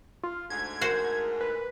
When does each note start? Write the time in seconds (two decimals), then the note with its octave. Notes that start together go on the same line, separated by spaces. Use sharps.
0.23 F4
0.50 D2 G#2 G#6
0.81 F#4 A#4 C5
1.41 B4